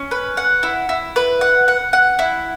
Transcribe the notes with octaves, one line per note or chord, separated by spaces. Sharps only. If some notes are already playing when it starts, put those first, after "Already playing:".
Already playing: C#4
B4
F#5
E4
E4
B4
F#5
F#5
F#5
E4